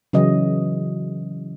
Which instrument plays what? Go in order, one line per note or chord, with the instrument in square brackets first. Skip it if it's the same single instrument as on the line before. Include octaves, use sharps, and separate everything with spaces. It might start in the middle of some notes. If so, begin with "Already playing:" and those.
[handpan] C#3 E3 F#3 D#5